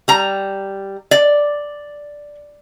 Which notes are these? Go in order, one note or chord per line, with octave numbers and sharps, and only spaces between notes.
G3 A#5
D5